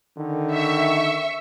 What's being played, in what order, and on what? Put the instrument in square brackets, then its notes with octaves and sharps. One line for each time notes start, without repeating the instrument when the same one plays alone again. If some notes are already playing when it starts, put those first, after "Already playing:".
[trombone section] D3 D#3
[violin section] E5 C#6